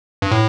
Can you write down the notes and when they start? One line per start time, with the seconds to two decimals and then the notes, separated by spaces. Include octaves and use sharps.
0.22 G2
0.31 A2